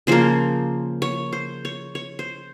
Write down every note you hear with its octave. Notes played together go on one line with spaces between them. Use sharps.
C#3 F3 A#3 C5
C#5
C5
C#5
C#5
C5